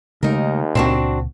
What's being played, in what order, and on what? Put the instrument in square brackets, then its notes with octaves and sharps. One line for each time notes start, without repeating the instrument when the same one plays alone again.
[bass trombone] D#2 [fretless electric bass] C#3 G#3 A3 [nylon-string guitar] D#4 A#4
[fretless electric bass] C#2 A#2 [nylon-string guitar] C4 D4 F#4